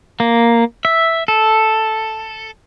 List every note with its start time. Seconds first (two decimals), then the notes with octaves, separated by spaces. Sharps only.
0.20 A#3
0.85 E5
1.28 A4